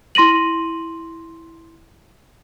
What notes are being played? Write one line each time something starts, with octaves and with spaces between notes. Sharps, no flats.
E4 C6 A#6 D#7 F#7